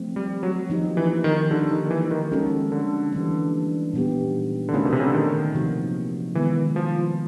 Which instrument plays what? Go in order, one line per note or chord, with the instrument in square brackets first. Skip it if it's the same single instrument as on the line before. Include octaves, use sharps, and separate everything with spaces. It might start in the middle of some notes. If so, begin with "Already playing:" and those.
Already playing: [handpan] F3 A3 C4
[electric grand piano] G3
F#3
[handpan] F3 A#3 D#4 G4
[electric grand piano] E3
D#3
[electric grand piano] D3 [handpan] G3 A#3 D#4 G4 A#4
[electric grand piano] D#3
E3
D#3
[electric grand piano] D#3 [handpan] G#3 C#4 F#4 A4
[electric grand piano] D3
[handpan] E3 G3 A#3 D4
A#2 G3 B3 D#4 G4
[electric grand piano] D3
[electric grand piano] C#3 [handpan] A3 C4 D#4 F#4 A#4
[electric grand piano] B2
C3
C#3
D3
D#3
[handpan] C3 F3 A#3 D#4 F#4
[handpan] D#3 G#3 B3 [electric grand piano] E3
[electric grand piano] F3